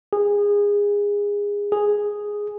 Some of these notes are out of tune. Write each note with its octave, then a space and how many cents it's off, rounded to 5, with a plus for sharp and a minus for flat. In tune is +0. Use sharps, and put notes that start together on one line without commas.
G#4 -25
G#4 -5